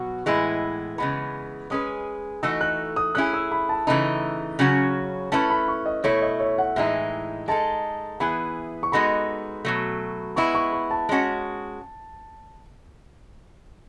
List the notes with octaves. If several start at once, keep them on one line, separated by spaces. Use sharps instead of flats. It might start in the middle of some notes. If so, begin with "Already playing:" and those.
Already playing: B2 F#3 F#4
A2 E3 G#3 B3 E4
C#3 E3 G#3 B3 B5
G#3 C#4 G#4 B4 D#6
E3 A3 D#4 F#4 A4 E6
F#6
D#6
A3 C#4 E4 G#4 F#6
E6
B5
A5
C#3 E3 A3 D#4 B5
C#3 F#3 C#4 F#4
A3 C#4 E4 B4 A5
B5
C#6
D#5
B2 A3 E4 A4 C#5
D#5
C#5
F#5
A2 E3 G#3 D#4 E5
G#3 D#4 A4 A5
E3 B3 E4 G#4 B5
C#6
G#3 B3 D#4 F#4 A4 B5
B2 F#3 A3
G#3 B3 E4 C#6
C#6
C#6
A5
G#3 C#4 F#4